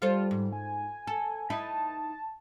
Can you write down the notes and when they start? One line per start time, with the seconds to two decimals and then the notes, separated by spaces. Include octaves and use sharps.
0.02 G3 F4 A4 C5
0.31 G#2
0.52 G#5
1.07 A4
1.50 D#4 E4 B4 A5